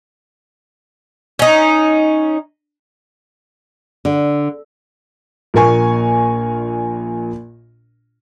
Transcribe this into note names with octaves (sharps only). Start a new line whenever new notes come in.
C#4 D#4
D3
A#1 A#2 A#4 G#5 C#6